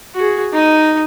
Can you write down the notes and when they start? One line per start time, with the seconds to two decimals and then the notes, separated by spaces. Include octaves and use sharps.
0.15 F#4 G#4
0.53 D#4 D#5